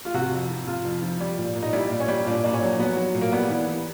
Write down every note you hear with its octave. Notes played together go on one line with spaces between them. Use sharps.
F4
C3 F#4
F2
F3
C3 F4
F2
F3
G3
A#2
A#2
D#4
G3 E4
A#2
C#4
G3
A#2 D4
A#2 D4
C#4
F#3
F#3 B3
F#3
A#2
A#3
G3 B3
E3
E3